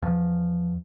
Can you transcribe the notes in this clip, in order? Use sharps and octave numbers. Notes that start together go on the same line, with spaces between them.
E2 F3